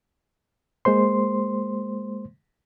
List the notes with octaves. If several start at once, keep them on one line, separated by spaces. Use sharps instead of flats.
G#3 A#3 C5 C6